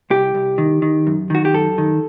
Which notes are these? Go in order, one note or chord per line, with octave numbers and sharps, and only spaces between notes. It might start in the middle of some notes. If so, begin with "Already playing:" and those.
C2 G4
C2
D#3
D#3
F#2
D#3 F#4
G4
F#2 A4
D#3